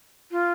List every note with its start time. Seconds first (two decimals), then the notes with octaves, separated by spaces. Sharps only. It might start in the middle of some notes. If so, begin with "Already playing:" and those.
0.31 F4